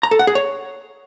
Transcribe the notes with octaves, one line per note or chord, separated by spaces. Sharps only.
A#5
A4
F#5
G#4
C#5